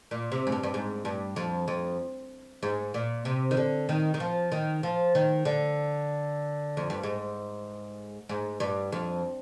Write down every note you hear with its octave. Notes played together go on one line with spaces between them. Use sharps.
A#2
C3
G#2
G2
G2
G#2
G2
F2
F2
G#2
A#2
C3
D#3
D3
D#3
D#3
F3
D#3
F3
D#3
D3
F2
G2
G#2
G#2
G2
F2